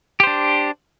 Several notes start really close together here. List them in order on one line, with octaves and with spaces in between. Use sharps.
G4 C5 D4